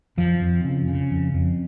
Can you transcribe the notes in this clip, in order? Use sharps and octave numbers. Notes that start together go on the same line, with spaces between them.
F2 F3
F2
C#3
C#3
F2
F2